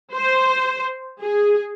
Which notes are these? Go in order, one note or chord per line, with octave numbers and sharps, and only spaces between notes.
C5
G#4